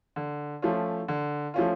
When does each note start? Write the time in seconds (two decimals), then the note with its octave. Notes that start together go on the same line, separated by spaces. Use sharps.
0.16 D3
0.62 F3 A3 C#4 F4
1.08 D3
1.54 F3 A3 C#4 F4